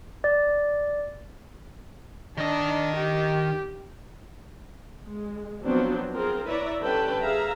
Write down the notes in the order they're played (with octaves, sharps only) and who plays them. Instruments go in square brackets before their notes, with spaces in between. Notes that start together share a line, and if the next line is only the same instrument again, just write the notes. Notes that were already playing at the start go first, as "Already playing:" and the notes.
[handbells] D5
[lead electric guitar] D#3 D#5 [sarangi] D4
[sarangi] G4
[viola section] G#3
F3 F#3 B3 C4 D4 F#4
B3 C4 F4 G#4 A#4
E4 B4 C#5 D5 E5 A#5
D3 G3 C#4 B4 G5 A5
G#4 B4 E5 F5 A#5